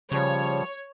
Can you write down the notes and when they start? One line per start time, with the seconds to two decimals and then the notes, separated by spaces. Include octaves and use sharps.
0.11 C#3 F3 G3 C#5